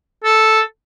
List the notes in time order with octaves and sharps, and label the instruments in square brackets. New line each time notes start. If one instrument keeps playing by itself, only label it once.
[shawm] A4